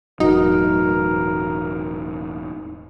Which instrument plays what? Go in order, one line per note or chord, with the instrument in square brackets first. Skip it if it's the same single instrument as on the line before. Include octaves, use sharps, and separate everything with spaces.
[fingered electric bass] E1 A2 F#3 [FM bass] D#4 [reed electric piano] F#4 [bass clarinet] A#4